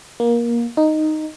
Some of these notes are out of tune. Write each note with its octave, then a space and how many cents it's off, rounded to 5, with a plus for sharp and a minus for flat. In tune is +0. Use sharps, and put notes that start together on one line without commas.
A#3 +20
D#4 -5